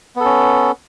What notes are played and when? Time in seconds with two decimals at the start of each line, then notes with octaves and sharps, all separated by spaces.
0.16 B3
0.20 A4
0.25 C#4